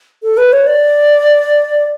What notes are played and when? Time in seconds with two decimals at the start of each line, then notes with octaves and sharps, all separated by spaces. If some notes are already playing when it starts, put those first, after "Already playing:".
0.23 A4
0.37 B4
0.52 C#5
0.67 D5